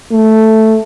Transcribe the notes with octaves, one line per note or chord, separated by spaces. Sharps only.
A3